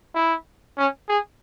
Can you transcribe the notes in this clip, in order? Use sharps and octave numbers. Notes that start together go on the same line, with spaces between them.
E4
C#4
G#4